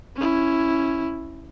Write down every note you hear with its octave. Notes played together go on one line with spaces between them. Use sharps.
C#4 E4